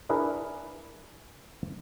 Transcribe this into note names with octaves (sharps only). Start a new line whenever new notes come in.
D4 E4 G#4 A#4 B4